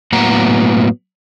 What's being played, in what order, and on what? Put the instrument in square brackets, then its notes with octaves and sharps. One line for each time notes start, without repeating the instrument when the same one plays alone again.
[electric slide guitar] A2 F#3 A#3 B3 F#5 A#5